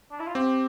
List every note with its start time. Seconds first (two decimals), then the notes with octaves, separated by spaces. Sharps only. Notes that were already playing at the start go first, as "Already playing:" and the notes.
0.11 D4
0.19 E4
0.27 F4
0.35 C4 G4